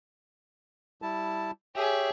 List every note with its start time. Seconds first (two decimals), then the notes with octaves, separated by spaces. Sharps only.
1.02 G3 E4 A5
1.76 G4 G#4 C#5 E5 G5